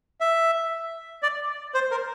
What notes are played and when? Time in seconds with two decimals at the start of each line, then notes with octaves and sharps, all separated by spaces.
0.21 E5
1.23 D5
1.74 C5
1.91 A#4